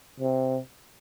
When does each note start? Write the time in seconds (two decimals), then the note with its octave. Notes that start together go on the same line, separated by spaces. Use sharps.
0.20 C3